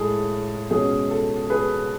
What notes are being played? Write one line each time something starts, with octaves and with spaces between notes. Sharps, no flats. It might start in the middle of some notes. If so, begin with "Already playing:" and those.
Already playing: A2 G#3 G#4 A4
B2 G#3 C#4 G#4
A4
G#4 B4